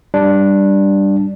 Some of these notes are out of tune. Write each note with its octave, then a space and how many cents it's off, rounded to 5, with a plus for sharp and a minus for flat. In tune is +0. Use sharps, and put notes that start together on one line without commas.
G3 +0 D4 +0